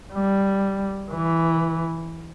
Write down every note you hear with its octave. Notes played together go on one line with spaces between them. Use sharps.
G3
E3